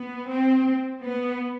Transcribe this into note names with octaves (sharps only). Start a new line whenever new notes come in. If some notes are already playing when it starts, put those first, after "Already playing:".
Already playing: B3
C4
B3